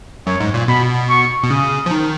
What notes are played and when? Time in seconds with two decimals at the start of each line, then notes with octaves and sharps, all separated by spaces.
0.27 F#2 C#5
0.40 G#2
0.54 A#2
0.68 B2 B5
1.10 C#6
1.43 B2
1.51 C#3 D#6
1.86 F3
1.91 D#3